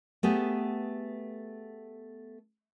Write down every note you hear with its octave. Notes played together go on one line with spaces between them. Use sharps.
A3 B3 G4 G#4